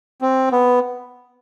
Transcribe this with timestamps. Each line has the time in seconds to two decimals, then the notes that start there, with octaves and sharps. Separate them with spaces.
0.21 C4
0.52 B3